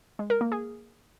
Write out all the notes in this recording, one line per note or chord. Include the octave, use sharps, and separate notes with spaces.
G#3
A#4
A#3
G#4